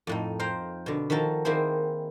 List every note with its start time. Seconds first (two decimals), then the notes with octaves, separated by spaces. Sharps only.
0.07 F2 A2 D#4
0.39 C5 F5 G5 A#5
0.86 B2 D3
1.10 D#3 F3 F#4 A4 A#4
1.45 D#3 A#3 C4 E4 G#4 C5